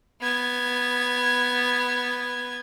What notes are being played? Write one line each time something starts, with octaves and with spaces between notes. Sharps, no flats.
B3 G#6